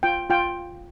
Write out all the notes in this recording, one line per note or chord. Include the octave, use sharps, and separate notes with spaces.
F4 G5
F4 G5